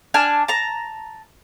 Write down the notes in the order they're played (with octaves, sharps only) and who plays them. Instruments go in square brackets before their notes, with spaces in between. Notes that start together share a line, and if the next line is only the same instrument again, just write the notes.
[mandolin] D4 G#5 A5 F6
A5 A#5